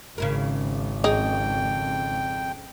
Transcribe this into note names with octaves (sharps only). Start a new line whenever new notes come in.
G#1 C#3 E4 A#4
F2 D#4 G#4 G5